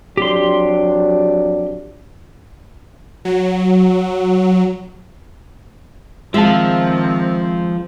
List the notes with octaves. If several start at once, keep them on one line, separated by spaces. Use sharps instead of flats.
F2 F#3 D4 G4 C6
F#3
D#3 F3 G#3 C4 E5 F5 A5